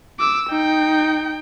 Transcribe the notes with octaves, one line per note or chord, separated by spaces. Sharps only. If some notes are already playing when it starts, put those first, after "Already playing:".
D6 E6
D#4 G5